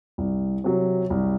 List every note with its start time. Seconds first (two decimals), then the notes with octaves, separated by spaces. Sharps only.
0.18 C2
0.64 C3 F#3
1.10 C2